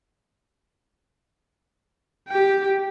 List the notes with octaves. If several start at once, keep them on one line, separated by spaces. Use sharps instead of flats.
G4 G5